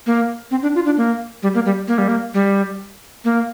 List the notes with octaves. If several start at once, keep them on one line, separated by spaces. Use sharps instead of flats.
A#3
C4
D4
F4
D4
A#3
G3
A#3
G3
A#3
G3
A#3
G3
A#3